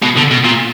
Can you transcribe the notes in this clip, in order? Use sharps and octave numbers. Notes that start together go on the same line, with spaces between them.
B2
D3
B2
A#2